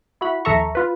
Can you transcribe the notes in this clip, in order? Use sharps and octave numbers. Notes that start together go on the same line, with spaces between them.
E4 F#4 B5
A#1 D#2 A4 E5 A#5 C#6
F4 B4